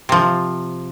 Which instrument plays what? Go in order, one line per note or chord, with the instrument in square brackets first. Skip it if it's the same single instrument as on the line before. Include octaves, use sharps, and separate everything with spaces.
[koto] C3 F3